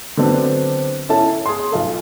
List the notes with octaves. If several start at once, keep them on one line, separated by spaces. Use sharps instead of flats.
D3 F#3 B3 C4 D4
C#4 E4 A4 A5
G#4 C6
B1 F4 A4